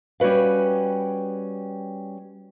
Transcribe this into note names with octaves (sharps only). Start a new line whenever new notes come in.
G3 C#4 F#4 B4 F5